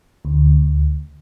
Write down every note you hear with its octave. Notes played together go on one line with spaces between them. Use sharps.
D2